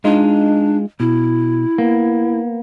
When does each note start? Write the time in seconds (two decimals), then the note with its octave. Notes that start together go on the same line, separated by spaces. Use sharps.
0.05 G#3 D4 D#4 F4
1.00 B2 E4
1.78 A#3 B3